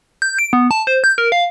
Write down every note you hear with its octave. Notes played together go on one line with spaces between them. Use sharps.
G6
D7
B3
A5
C5
G6
A#4
F5